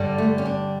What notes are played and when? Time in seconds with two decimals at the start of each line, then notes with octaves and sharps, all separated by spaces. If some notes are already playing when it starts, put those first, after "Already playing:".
Already playing: G2 D3 G3
0.18 A3
0.38 C#4
0.45 D4